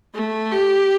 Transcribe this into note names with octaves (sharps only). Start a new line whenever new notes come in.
A3
G4